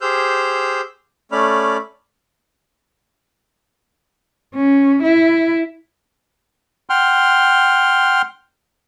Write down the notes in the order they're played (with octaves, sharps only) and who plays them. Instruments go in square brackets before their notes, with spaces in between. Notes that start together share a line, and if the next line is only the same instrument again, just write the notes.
[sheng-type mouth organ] G4 G#4 C5 E6 F6 G6
A3 C#4 D5 B5 F6
[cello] C#4
E4
[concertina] F#5 G5 C6 F6